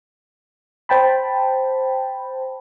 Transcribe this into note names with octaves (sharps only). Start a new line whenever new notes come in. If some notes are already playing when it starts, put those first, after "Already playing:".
C5 G5 A5 B5